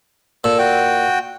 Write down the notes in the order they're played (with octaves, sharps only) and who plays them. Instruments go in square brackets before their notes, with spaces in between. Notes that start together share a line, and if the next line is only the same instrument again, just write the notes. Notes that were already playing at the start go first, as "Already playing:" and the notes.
[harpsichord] A#2 [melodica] A4 E6
[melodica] F#4 G5